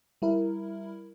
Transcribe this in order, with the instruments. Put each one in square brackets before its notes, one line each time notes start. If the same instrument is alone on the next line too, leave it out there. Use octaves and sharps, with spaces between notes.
[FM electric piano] G3 E4 A#4